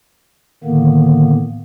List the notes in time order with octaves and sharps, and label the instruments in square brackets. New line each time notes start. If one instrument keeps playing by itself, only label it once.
[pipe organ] A2 D3 D#3 A#3 B3